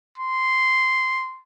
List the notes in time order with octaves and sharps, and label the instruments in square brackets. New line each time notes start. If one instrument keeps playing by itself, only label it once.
[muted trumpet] C6